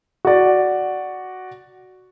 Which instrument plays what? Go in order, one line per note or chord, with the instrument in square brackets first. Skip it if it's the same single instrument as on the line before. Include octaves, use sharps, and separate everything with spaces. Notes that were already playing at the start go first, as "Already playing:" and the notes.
[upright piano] F#4 D5